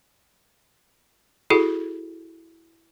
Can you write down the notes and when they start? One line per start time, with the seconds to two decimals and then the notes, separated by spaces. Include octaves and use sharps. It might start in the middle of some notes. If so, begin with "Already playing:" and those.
1.50 E4 F#4 G#4 A4